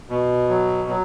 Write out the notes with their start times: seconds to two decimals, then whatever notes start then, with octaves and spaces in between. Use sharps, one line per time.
0.09 B2
0.49 F#3
0.89 F#3